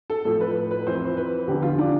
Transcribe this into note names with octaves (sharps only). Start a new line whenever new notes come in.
A4
A2 F3 A4
B4
B4
F2 E3 C5
B4
E2 D3 F3 G4
F4
D4